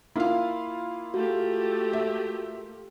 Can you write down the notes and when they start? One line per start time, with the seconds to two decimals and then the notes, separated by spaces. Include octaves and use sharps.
0.16 A#3 E4 F4 F5
1.14 A3 F#4 G4
1.93 E5